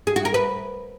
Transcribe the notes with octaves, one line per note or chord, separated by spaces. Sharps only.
G#4
F#4
A#4
B4